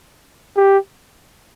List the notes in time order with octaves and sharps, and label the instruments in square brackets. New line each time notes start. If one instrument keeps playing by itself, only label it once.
[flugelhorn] G4